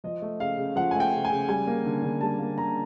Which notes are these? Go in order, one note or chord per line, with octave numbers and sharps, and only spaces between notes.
F3 D#5
A3
C#3 F5
C#3
F3 F#5
A3 G#5
G5
C#3
G#5
C#3
G3 G#5
A#3
D3
D3
G3 A5
A#3
D3 A#5